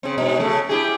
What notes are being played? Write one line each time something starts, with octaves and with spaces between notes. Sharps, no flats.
C#3 C4
G#2 B2
C#3 A3
E4 G4 G#4